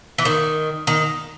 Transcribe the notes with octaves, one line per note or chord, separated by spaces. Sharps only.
E3
D#3
D#3